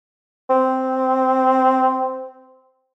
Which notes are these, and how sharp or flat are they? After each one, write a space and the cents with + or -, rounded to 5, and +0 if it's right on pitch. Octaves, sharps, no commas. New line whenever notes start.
C4 -5